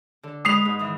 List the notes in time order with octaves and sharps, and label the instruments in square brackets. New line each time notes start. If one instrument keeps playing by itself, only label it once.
[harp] D3
[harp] G#3 B4 [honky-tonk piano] D#6 C7 F7
[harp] G#2
D#3 E3